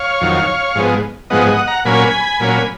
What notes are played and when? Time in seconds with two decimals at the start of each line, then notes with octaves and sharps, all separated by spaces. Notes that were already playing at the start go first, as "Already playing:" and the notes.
Already playing: C#5 F5
0.21 F2 D#3 F#3
0.75 G#2 F3 G#3 B3
1.30 G#2 F3 G#3 B3 D#5 F#5
1.49 D#5 F#5
1.67 F#5 A#5
1.85 A#2 F#3 A#3 C#4 G#5 B5
2.40 A#2 F#3 A#3 C#4